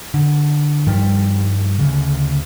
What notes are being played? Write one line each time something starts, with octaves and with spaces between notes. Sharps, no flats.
D3
G2 D#3 F3 G3
D2 C#3